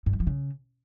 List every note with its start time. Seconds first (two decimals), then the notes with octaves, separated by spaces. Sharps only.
0.06 G2
0.13 E3
0.20 F3
0.27 C#3